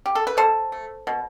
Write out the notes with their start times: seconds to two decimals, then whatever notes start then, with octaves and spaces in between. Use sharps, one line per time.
0.06 G4
0.15 A4
0.27 B4
0.37 B2 A4 C5
0.72 A3
1.07 B2